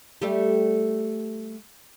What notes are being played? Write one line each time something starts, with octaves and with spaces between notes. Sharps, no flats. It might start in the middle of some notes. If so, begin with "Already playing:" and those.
G3 A3 G4